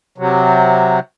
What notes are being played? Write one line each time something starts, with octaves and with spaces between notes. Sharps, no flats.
C3 F#3